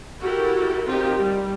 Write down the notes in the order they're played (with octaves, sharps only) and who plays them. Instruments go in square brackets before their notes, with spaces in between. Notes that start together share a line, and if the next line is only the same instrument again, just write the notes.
[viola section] E4 F#4 G4 A4 A#4
C4 D#4 F4 G4 A#4
G3